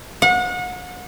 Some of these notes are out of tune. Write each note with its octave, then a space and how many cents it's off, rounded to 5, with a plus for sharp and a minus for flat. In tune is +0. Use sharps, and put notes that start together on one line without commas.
F#5 -35